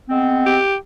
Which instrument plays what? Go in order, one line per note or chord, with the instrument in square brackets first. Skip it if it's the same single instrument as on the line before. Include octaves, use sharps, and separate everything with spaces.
[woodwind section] G#3 B3 C4
[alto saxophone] G4